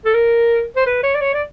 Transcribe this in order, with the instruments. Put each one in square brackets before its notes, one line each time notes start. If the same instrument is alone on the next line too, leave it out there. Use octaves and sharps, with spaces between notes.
[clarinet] A4
A#4
C5
B4
C#5
D5
C#5
D5